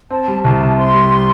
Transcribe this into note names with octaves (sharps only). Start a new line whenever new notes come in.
C4 A5
G3
C2 A5
C3
C4 C6
G3